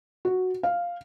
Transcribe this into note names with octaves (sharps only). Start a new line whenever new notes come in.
F#4
F5